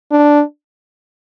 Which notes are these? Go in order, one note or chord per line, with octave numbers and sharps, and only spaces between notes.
D4